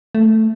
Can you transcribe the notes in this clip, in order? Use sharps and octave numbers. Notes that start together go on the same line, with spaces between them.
A3